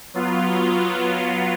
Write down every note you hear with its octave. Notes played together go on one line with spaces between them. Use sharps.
F#3 B3 F4